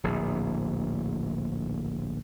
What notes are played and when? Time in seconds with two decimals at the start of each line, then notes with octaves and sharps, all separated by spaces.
0.04 D1 A#1